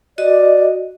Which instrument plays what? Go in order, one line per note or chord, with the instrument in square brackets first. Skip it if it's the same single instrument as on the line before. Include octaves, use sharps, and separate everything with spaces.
[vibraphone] F#4 D#5 [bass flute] D5